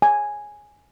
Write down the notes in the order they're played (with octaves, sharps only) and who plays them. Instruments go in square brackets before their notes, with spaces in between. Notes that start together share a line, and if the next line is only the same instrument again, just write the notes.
[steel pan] G#5